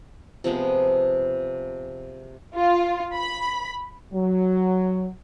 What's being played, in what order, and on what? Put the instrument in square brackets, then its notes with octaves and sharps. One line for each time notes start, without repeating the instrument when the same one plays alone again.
[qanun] C3 F3 G#3 B3
[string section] F4
B5
[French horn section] F#3